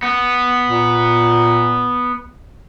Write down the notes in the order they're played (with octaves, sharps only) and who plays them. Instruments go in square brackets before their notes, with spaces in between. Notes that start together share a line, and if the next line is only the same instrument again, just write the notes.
[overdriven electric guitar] B3
[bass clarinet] A#2